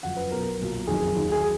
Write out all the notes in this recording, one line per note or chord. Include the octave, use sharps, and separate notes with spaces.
F#1 F#2 F3 F#5
B4
B1 B2 F#3 A#4
B1 A#2 F#3
F#1 F2 D#3 F#3 G#4
D#2 D#3 F#3
G#4